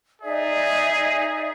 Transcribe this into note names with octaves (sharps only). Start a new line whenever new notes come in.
D#4 G#4 D5 E5